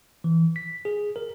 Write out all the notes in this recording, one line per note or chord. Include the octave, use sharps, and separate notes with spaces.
E3
B6
G#4
A#4